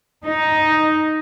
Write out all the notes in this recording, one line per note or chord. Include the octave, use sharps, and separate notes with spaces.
D#4